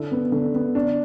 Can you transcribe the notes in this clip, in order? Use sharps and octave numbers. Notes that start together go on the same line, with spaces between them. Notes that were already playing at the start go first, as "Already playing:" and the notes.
Already playing: D3 E4
B3
D3
B3
D4